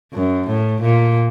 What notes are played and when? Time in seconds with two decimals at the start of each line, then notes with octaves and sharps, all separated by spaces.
0.13 F#2
0.47 A2
0.81 A#2